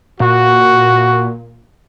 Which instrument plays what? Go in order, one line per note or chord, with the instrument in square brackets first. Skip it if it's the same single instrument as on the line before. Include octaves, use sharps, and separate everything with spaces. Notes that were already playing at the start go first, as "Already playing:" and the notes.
[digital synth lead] A#2 [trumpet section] F#4